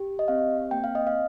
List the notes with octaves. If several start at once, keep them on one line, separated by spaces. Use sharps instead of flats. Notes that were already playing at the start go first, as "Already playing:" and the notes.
Already playing: G4
D#5
C4 F5
A#3 G5
F5
D#5
F5